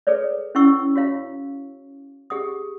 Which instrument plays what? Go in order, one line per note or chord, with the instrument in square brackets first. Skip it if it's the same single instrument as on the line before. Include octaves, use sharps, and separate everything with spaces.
[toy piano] G#4 A4 B4 C#5 D5
C#4 E4 F#5 C#6 E6
F#4 C#5 F5 A#5
G4 G#4 F#5 D#6